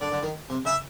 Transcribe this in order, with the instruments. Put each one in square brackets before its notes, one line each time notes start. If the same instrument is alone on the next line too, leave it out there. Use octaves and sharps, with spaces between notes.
[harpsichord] D3 [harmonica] D5
[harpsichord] D3
D#3
C3
[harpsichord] C#3 [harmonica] E5